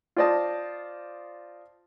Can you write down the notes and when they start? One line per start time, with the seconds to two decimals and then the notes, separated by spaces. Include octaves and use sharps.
0.16 F4 C5 D5 D#5 A5